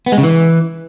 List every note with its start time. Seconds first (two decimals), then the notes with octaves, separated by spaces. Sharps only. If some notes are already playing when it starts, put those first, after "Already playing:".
0.06 B3
0.12 G#3
0.18 C#3
0.23 E3